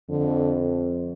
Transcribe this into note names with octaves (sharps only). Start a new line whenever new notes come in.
F2 D3